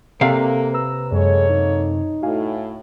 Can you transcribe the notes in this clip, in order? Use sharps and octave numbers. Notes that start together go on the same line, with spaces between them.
C3 A#3 A4 D5 F5
B4 A#5 E6
F#2 G#3 A#3 A4 C#5
D#4
A2 F#4 F5 G#5